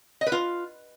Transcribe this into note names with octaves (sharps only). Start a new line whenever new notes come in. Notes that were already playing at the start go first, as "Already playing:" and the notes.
D#5
B4
F4